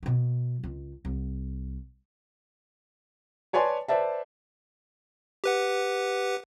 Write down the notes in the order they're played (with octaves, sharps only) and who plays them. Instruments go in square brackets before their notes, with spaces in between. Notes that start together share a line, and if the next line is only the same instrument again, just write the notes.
[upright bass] B2 A#3
C#2
C2
[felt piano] B4 C#5 D5 G#5 A5 C6
B4 C5 D5 E5 A5
[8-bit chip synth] G4 B4 F#5